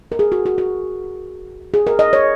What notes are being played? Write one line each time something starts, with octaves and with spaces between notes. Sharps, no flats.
A#4
G#4
F#4
F#4
F#4
G#4
A#4
D#5
C#5